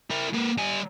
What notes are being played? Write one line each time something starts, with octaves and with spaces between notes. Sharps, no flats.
E4 A#4
A#3 B4
G3 G#5